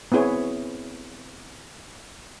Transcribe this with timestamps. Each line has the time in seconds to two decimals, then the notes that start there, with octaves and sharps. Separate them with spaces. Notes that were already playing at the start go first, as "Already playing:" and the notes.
0.12 B3 C4 E4 G#4 C#5